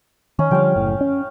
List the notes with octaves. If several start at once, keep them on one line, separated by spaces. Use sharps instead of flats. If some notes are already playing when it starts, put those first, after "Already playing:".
D#3 C#4
D3 F3 G3 F5 G5
F#1 A2
C#4